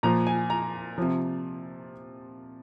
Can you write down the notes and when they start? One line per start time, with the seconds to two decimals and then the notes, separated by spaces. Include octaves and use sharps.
0.03 A#2 F3 A#5
0.27 G#5
0.50 A#5
0.98 C3 F3